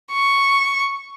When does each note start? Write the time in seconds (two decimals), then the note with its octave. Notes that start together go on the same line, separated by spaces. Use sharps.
0.12 C#6